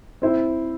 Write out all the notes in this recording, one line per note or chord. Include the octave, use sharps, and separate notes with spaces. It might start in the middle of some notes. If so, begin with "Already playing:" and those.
C4 E4 C5